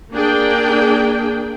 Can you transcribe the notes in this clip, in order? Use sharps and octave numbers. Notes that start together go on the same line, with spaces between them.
A#3 D4 G#4 G5